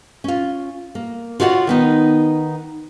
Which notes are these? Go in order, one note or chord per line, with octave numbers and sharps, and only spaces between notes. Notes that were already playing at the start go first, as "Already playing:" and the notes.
C#4 F4
A#3
F4 F#4 C#5 D5 E5 F#5
D#3 B3 D#4